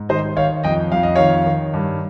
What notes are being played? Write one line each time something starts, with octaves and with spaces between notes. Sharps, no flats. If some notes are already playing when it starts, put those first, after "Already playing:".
Already playing: G#2
D#3 C5 D#5
D#3 C#5 F5
F2 D#5 G5
F2 F5
D#5
D#3 C#5 F5
D#3
G2